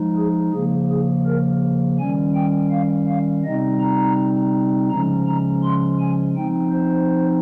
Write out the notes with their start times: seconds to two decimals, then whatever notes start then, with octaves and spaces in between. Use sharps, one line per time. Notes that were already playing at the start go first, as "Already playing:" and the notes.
Already playing: F3 G#3 D#4
0.17 G#4
0.53 C#3 F3 A#3 G#4
0.90 G#4
1.26 A#4
1.99 D#3 G3 C#4 G#5
2.35 G5
2.71 F5
3.07 F5
3.45 C3 G3 C4 D#4 D#5
3.80 A#5
4.90 C#3 F3 G#3 C#4 A#5
5.27 A#5
5.63 C6
5.99 G#5
6.35 F3 C4 D#4 G5
6.72 C5